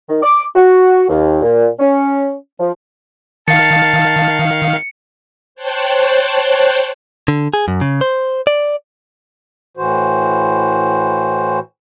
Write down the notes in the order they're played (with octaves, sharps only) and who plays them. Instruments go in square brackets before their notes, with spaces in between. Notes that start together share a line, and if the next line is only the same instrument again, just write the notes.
[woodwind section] D#3
D6
F#4
D#2
A#2
C#4
F3
[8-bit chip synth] D#3 F5 [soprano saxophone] A5 [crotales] C#7
[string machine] C5 C#5 G5 A5 F#6
[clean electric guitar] D3
G#4
F#2
C#3
C5
D5
[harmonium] A2 E3 F#4 C5